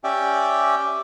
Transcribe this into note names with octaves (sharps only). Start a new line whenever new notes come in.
C#4 G4 D5 E5 G5